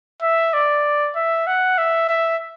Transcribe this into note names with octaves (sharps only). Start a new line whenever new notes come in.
E5
D5
E5
F#5
E5
E5